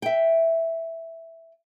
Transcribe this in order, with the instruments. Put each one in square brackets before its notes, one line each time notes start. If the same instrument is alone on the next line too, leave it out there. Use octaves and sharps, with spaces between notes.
[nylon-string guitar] E5 G5